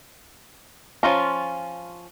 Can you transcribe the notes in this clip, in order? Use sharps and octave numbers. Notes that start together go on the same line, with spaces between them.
F3 C#4 F4 A#5